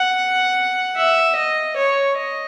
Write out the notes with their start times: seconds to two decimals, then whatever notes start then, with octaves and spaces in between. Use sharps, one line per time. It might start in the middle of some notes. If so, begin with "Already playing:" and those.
Already playing: F#5
0.96 E5
1.36 D#5
1.77 C#5
2.18 D#5